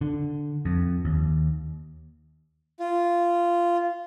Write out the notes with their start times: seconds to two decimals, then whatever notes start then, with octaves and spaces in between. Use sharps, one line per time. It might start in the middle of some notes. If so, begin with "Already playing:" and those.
0.01 D3
0.65 F2
1.05 D#2
2.80 F4